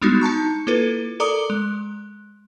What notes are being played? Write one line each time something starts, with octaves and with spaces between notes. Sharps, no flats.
G3 G#3 B3 D4 D#4 F#4
D#4 A5 A#5 C#6
A#3 E4 F4 A4 B4
A4 A#4 D5 A#5 D6 D#6
G#3